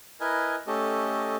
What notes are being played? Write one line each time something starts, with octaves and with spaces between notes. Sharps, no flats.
E4 A#4 B4 D#5 G#5
A3 C#4 G4 A4 D#5